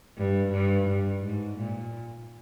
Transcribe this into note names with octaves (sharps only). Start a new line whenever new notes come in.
G2
G2
G2
G#2
A#2